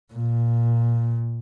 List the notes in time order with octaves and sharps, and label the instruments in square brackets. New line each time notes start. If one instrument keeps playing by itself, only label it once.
[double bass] A#2